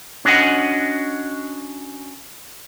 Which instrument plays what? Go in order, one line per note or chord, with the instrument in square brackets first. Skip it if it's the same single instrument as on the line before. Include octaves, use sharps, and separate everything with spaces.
[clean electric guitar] C#4 D4 F#4 D#5 F#5